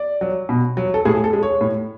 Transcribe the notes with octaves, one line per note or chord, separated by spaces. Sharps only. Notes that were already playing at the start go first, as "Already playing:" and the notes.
Already playing: D5
F#3
B2
F#3
A4
A2 G#4
A4
G#3
C#5
A2